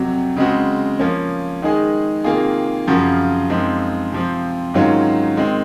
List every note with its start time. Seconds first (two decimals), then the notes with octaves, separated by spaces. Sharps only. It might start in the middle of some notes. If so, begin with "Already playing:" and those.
Already playing: F2 C3 F#3
0.37 C#3 G#3 C4 F#4
1.00 F3 A#3 C#4
1.62 D#3 G#3 D#4 G#4
2.24 C3 D#3 A#3 F4 G#4
2.88 F#2 C#3 F3 C4 F#4
3.50 F#2 F3 G#3 C4 D#4
4.13 C3 F3 C4
4.74 G#2 D#3 F#3 C#4 F4
5.37 D#3 G#3 C4